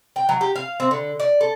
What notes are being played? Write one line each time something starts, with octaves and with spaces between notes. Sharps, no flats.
G5
F#3
G4
F5
C4
D3
D5
A4